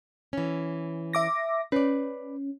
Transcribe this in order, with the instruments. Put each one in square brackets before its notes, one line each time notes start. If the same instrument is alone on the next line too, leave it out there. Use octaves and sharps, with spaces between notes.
[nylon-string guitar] E3 C#4
[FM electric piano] E5 D6 A#6
[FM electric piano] C#4 [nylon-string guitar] B4 D5